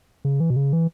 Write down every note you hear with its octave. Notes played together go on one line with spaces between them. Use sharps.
C#3
E3
B2
C#3
E3